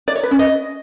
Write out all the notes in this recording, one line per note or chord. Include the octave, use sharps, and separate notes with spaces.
D5
C#5
B4
C#4
D#5